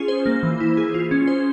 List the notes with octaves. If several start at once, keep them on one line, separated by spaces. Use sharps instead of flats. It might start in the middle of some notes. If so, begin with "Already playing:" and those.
Already playing: C#4 F4 G#4
C5
A#3
E3
E4
G#4
F4
C#4
C5